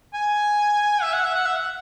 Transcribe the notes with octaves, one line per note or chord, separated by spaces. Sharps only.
G#5
E5
F#5
E5
F#5
E5
F#5